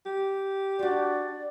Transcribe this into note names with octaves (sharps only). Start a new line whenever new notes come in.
G4
D4 F4 F#4 D5